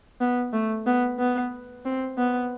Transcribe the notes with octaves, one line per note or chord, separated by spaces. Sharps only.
B3
A3
B3
B3
C4
B3